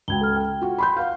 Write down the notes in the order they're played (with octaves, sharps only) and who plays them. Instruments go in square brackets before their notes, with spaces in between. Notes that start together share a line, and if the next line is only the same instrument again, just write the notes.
[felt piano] C#2 F#4 [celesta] G5 G#6 G7
[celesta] A4 F6
G5
[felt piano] F4 F#4
B5 C6 G6
F5 F#5